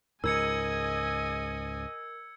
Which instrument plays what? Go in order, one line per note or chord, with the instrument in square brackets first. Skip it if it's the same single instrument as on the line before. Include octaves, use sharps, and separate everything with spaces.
[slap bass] C#2 G#2 [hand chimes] A#4 [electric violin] D#5 G#5 [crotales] E6 G#6 C#7